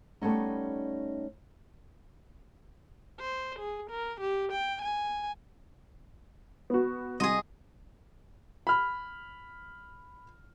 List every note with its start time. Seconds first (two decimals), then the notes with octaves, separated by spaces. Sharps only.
0.21 G3 A3 B3 C#4 D#4
3.20 C5
3.59 G#4
3.91 A#4
4.21 G4
4.52 G5
4.82 G#5
6.70 B3 F#4
7.20 C2 G#4 D#5 C6
8.67 B5 F6